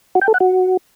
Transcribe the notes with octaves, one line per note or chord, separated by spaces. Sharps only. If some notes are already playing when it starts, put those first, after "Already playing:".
F#4
G5
A4
F#5
F#4